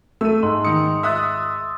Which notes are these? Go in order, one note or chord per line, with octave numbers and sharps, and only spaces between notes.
A3 E6 D#7
G#2 C6
D#3 D#6 C#7
E5 D#6 E6 F#6 A6